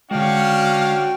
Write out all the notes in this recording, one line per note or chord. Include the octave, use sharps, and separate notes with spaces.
D3 G#3 C#4 D4 F#4 F5 G5